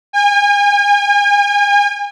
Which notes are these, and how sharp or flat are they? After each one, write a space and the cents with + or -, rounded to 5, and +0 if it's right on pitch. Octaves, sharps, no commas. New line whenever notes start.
G#5 -40